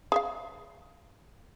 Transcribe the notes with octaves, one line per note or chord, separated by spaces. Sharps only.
G#4 E5 F5